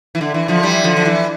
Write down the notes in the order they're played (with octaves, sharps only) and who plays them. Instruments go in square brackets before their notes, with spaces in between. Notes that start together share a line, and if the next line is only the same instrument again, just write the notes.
[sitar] E3
D3
E3
D3 F3
E3 G3
D3 F3
F3
E3